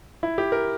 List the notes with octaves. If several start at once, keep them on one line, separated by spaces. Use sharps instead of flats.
E4
G4
A#4